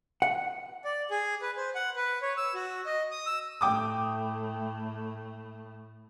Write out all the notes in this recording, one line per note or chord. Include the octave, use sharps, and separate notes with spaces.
F#5
D5
G#4
B4
C5
F#5
B4
C#5
E6
F#4
D#5
D#6
E6
A2 A3 G5 D6 D#6